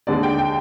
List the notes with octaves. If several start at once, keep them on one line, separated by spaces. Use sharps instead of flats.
D#2 D3 G#3 D5
G5
G5